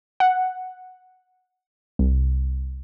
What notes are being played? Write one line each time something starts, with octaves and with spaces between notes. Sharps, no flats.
F#5
C2